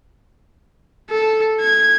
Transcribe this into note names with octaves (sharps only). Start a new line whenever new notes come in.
A4
G#6